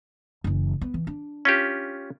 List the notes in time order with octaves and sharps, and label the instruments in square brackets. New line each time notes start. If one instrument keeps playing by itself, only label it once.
[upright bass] F#1 E3
B3
E3
D4
[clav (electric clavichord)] C#4 F4 G4